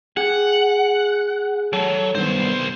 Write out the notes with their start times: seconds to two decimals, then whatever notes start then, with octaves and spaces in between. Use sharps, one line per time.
0.17 G#4 F#5 G5
1.73 F#3 A4
2.15 C2 G2 D#3 B3 C5